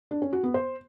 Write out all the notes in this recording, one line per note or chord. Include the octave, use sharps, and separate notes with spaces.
D4
C#4
F#4
B3
C5